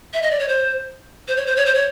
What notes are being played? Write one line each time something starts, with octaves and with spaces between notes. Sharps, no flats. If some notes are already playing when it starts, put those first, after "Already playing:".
E5
D#5
D5
C#5
C5
C5
C#5
C5
C#5
C5
C#5